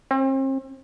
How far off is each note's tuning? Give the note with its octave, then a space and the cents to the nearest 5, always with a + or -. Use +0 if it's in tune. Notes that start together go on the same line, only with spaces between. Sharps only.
C4 +40